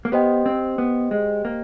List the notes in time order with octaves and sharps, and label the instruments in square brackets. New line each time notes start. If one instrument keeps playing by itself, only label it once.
[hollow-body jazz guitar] A#3
[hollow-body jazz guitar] B3 [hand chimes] G4 C5 D#5 G5
[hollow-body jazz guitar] C4
B3
G#3
A#3